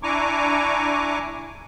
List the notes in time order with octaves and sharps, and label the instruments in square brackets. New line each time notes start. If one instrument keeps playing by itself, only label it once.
[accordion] D4 E4 G#5 A#5 C#6 D6